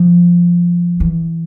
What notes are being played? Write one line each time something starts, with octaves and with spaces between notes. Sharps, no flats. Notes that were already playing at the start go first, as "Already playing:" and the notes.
Already playing: F3
E3